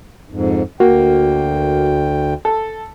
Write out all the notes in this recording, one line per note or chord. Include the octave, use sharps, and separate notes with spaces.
F2 G#2
D2 A#3 F#4 G5
A4